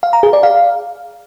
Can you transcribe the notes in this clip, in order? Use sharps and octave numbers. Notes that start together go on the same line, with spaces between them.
F5
A#5
G#4
D5
F5